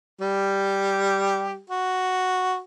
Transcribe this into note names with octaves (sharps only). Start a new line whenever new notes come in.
G3 G4
F#4